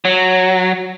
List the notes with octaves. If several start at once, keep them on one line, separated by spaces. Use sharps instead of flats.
F#3